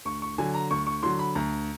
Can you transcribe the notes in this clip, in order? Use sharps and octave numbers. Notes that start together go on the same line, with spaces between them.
D2 C#6
C#6
D3 F#3 G#5
A#5
D2 C#6
C#6
D3 F#3 C6
B5
D2 A#5